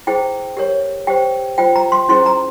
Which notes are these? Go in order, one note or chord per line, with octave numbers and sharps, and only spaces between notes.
E4 G#4 C5 G5
G4 A#4 C#5
G4 C5 G5
F4 C5 G5
A#5
C6
C#4 E4 G#4 C5 C6
A#5